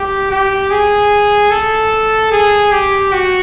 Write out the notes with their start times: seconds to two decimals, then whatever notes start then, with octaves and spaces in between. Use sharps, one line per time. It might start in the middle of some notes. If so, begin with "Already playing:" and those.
Already playing: G4
0.31 G4
0.71 G#4
1.51 A4
2.31 G#4
2.72 G4
3.12 F#4